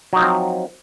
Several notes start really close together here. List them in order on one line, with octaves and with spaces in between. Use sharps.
F#3 D#4 F3 C4